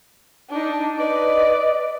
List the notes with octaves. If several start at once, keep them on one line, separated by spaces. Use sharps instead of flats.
D4 D#4
B4 D5 D#5